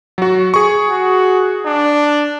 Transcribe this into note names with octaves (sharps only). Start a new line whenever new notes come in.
F#3 F#4
G#4 C#6
F#4
D4